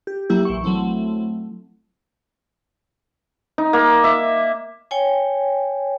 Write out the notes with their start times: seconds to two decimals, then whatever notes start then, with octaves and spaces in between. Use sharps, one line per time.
0.07 G4
0.30 F#3 A#3 E4 G4
0.45 A#1 E3 C#6
0.64 F#3 A3 C4 E4
3.58 D#4
3.73 A#3
4.04 E5
4.91 C#5 G5 G#5